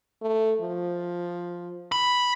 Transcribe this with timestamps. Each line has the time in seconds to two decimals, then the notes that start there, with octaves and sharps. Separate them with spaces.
0.22 A3
0.61 F3
1.92 B5